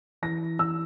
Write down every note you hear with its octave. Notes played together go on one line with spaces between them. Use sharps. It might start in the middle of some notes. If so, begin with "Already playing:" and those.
E3 A#6
E3 E6